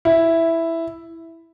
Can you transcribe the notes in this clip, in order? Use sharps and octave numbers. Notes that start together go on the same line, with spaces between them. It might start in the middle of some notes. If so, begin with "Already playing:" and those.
E4